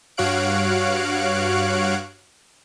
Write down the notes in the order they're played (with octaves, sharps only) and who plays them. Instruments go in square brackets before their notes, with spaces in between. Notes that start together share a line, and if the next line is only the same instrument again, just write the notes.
[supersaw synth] G2 F#4 C#5 F5 F#6 D7